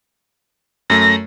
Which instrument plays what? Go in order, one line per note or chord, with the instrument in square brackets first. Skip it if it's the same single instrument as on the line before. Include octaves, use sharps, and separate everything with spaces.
[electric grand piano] F#2 A3 [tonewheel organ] A#6